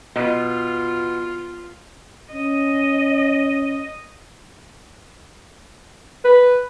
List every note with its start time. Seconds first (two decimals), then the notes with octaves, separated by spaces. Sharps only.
0.16 B2 F4
2.33 C#4 D#5
6.24 B4